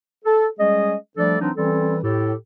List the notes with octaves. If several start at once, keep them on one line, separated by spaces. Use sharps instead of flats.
A4
G3 G#3 C#4 G#4 D#5
F3 G3 A3 D4 A4 D5
E3 F#3 C4 D4 D#4
E3 G3 C4 C#4 A4
A2 G4 A4